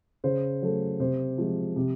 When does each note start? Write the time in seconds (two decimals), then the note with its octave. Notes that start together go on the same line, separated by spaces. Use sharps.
0.24 C#3 C5
0.62 F#3 A3
0.99 C3 C5
1.38 F3 G#3
1.76 C3